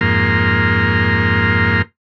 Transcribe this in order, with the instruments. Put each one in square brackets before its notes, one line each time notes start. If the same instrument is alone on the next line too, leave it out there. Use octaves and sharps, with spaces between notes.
[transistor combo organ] F2 G#2 A#3 A#4 C6